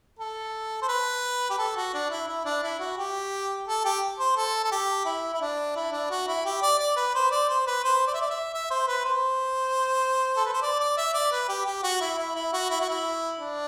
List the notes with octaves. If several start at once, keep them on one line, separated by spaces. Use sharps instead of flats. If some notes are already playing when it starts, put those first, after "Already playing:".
A4
C5
B4
G4
A4
F#4
D4
E4
E4
D4
E4
F#4
G4
A4
G4
C5
A4
A4
G4
E4
E4
D4
E4
D4
F#4
E4
G4
D5
D5
B4
C5
D5
C5
B4
C5
D5
E5
D5
E5
E5
C5
B4
C5
A4
B4
C5
D5
D5
E5
D5
B4
G4
G4
F#4
E4
E4
E4
F#4
E4
F#4
E4
D4